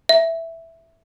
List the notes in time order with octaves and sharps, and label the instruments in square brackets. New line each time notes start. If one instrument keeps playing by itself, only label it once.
[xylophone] E5